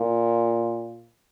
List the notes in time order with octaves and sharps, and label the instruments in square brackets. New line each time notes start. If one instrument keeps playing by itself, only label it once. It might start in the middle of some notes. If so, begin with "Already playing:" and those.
Already playing: [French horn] A#2